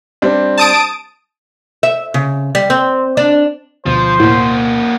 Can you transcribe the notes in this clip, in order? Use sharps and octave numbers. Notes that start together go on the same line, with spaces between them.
G3 C4 D4
A5 D#6 D7
E5
C#3
G3
C4
D4
D2 B2 F3 C5
A2 A#3 F#4